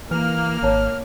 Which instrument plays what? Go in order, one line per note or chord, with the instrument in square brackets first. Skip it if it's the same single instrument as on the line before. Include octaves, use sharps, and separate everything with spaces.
[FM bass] E3 [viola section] A#3 [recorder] F6
[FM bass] G#1 [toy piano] B4 C#5 A5